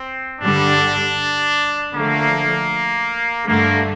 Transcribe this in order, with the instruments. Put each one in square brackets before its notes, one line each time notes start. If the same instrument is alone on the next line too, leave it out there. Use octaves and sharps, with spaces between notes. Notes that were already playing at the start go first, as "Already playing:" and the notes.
Already playing: [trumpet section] C4
[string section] G2 D3 G3 [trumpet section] D4
[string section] D3 F3 A3 [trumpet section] A#3
[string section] G2 D3 A3 D4 [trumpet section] A#3